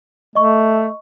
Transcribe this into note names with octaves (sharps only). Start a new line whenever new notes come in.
A3 D#5 C#6